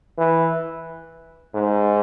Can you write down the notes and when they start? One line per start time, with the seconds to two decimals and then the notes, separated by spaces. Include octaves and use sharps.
0.18 E3
1.55 G#2